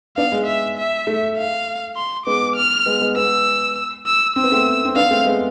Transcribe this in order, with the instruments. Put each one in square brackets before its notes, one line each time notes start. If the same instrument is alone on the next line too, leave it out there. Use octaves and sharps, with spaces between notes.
[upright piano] B3 D4 [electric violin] F5
[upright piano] G#3
[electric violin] E5
E5
[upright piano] A3
[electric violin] F5
C6
[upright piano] G#3 B3 [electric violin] D6
[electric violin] F6
[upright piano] G#3 B3
G#3 B3
[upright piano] G#3 B3 [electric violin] E6
[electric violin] E6
[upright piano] C4 [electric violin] E6
[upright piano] B3
A3 C4
C4
[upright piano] B3 D4 [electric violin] F5
[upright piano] A3 C4
G#3 B3